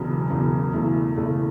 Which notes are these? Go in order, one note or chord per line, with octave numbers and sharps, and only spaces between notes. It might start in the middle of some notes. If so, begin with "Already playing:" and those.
Already playing: E1 E2 C#3 F#3
E1 E2 C#3 F#3
E1 E2 C#3 A3 E4
E1 E2 C#3 A3 E4